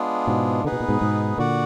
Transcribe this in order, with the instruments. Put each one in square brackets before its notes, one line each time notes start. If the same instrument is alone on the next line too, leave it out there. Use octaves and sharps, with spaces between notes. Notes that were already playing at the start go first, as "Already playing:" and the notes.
Already playing: [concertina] G#3 B3 D4 F4 G#4
[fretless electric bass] G#2 B2
[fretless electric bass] D3 [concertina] B3 D#4 G#4 B4
[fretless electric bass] B2
A#2
G#2 B2
G#2 B2
[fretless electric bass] A#2 D3 [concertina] F#4 D5 F#5